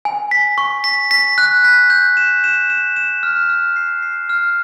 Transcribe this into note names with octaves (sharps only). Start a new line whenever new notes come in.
G#5
B6
C#6
B6
B6
F#6
B6
G6
E7
E7
E7
E7
F6
F6
C7
C7
F6